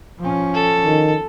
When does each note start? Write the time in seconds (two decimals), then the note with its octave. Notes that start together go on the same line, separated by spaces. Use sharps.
0.20 F3 C#4
0.54 A4
0.85 D#3